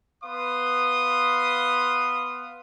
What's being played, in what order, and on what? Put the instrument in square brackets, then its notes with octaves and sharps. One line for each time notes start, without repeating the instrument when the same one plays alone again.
[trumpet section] B3 B4 F5 C6 D#6